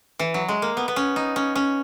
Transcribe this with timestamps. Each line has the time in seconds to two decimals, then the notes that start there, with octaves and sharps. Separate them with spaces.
0.19 E3
0.34 F#3
0.49 G#3
0.62 A#3
0.77 B3
0.88 B3
0.96 C#4
1.16 D#4
1.36 C#4
1.55 C#4